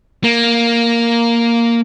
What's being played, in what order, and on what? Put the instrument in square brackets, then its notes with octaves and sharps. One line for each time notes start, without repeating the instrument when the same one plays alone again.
[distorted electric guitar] A#3